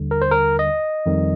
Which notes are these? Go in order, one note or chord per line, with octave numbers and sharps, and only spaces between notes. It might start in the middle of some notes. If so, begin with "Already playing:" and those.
Already playing: D#2 D3 G3
A#4
C5
A#4
D#5
F2 D#3 G3